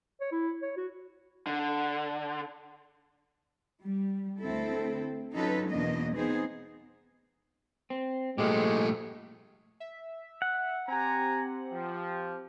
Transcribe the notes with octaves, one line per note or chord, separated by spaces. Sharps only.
C#5
E4
C#5
F#4
D3
G3
D2 C4 E4 A4
F#3 C#4 D#4 F4 A4 B4
E2 B2 E3 A#3 D4 D#5
B3 C4 D#4 G#4 C5
C4
G2 A#2 F3 G#3 A3 G4
E5
F#5
C4 G4 G#5 A#5
F3